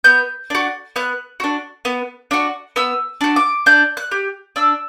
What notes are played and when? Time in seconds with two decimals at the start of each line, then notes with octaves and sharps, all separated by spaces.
0.04 B3 G6
0.50 D4 F#4
0.96 B3 F#6
1.40 D4 F#4
1.85 B3
2.31 D4 F#4
2.76 B3 E6
3.21 D4 F#4
3.36 D6
3.66 D4 G6
3.97 F#6
4.11 G4
4.56 D4 E6